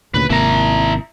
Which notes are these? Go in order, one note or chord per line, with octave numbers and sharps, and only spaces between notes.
D2 A#2 C#3 B4
G#1 C3 A#3 E4 A#5